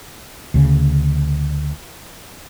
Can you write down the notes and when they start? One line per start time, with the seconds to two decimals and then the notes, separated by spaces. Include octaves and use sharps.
0.54 D2 C#3